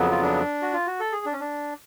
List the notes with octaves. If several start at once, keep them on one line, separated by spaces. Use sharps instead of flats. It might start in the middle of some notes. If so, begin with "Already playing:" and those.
Already playing: F2 C#3 F#3 B3
F4
D4
F#4
F4
F#4
A4
G#4
D4
C#4
D4